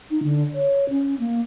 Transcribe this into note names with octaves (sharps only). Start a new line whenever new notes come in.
D#4
D3
C#5
C#4
A#3